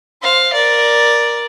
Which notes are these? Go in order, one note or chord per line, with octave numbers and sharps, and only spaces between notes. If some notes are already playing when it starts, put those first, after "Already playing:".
C5 F5
A#4 D5